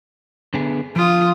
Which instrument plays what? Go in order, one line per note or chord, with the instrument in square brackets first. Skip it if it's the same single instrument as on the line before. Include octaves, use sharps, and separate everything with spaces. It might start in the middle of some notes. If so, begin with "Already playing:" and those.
[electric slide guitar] D3 B3 G#4
[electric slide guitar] F3 [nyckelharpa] F4 D#6